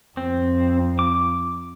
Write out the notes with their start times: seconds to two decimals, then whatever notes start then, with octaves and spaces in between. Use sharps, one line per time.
0.17 F2 C4
0.99 D6